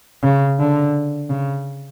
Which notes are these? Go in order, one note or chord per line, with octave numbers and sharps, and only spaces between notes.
C#3
D3
C#3